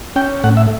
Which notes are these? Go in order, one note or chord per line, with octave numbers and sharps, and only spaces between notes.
C#4 G5
A2 F#5
E5